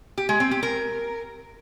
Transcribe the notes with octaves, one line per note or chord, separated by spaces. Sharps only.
G4
G#3
C4
G4
A#4